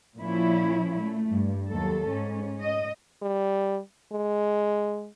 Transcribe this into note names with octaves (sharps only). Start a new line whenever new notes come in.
A#2 F3 C#4 E4
A3
G2
D#2 F#3 A4
G#2 C#4
D#5
G3
G#3